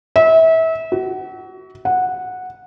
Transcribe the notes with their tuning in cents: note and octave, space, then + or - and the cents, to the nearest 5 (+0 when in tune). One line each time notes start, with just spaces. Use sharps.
E5 -30
F#4 +30
F#5 -10